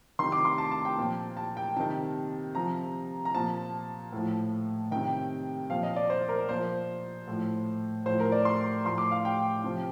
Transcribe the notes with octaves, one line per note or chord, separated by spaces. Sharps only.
C3 D#3 C6
D6
C6
A5
A5
G5
A#2 F3
A5
G5
C3 D#3 A5
C3 F3 A#5
A#5
A#2 F3 A5
A2 F3
C3 D#3 G5
A#2 F3 F5
D#5
D5
C5
A#4
A#2 F3 C5
A2 F3
A2 F3 C5
A#4
D5
C6
A2 F3 C6
D6
F5
G5
C3 F3